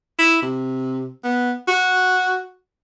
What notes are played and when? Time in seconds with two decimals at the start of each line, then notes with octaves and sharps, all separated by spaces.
0.19 E4
0.42 C3
1.24 B3
1.68 F#4